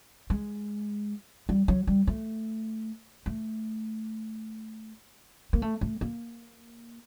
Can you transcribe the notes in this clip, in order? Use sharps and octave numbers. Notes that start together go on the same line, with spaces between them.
G#3
G3
F#3
G3
A3
A3
A#3
A3
A3
A#3